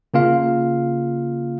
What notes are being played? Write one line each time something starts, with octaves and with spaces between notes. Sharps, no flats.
C#3 A#3 F4 F5